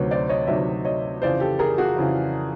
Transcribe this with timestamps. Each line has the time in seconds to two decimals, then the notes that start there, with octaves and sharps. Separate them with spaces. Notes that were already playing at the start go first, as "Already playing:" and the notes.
Already playing: D2 C3 D#3 F#3 B4 C#5
0.11 C5 D5
0.29 C#5 D#5
0.47 D2 C3 D#3 F#3 D5 E5
0.85 C#5 D#5
1.22 F2 C#3 E3 C5 D5
1.40 G4 A4
1.59 G#4 A#4
1.78 F#4 G#4
1.97 F2 C#3 E3